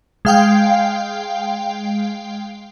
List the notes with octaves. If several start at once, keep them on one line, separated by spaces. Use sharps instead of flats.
G#3 F5 G5